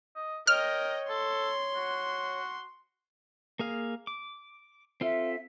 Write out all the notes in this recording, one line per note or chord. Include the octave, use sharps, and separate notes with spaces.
D#5
A#4 C#5 D#5 G5 F6
A4 C6
F#4
A#3 G#4 F5
D6
C4 F4 A4 E5